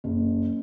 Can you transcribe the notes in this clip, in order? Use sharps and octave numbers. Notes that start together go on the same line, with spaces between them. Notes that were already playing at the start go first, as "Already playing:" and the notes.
F#1